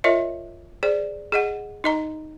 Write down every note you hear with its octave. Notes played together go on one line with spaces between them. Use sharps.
F4 A#4 C#5 D#5 E5
G#4 C5 D5
G#4 D#5 F#5
D#4 D#5 A#5